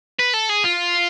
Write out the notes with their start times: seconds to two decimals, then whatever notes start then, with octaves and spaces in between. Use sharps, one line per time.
0.19 B4
0.34 A4
0.50 G#4
0.65 F4